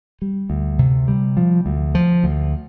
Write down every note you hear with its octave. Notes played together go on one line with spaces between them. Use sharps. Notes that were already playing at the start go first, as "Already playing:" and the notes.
G3
D2
C3
G3
F3
D2
F3
D2